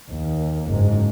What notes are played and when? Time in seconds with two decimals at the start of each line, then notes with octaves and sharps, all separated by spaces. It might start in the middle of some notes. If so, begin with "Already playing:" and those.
0.11 D#2
0.68 F#1 G#2